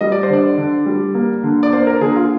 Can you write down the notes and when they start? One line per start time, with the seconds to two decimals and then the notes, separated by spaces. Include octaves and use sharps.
0.01 G3 D#5
0.12 D5
0.23 C5
0.30 D3 D5
0.58 D3
0.86 G3
1.14 A#3
1.43 D3
1.63 D5
1.73 A#3 C5
1.87 A#4
2.01 D3 G#4
2.16 F4